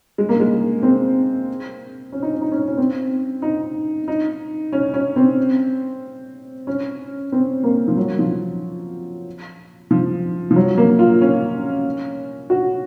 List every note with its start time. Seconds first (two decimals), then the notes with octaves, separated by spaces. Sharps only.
0.18 G#3
0.29 A#3
0.40 G#3
0.83 C4
2.12 C#4
2.22 D#4
2.33 C#4
2.42 D#4
2.52 C#4
2.68 C#4
2.78 C4
3.42 D#4
4.08 D#4
4.73 C#4
4.94 C#4
5.16 C4
6.67 C#4
7.32 C4
7.64 A#3
7.88 F3
7.97 F#3
8.19 F3
9.91 F3
10.51 F3
10.56 F#3
10.77 A#3
10.99 F4
11.21 C#4
12.50 F#4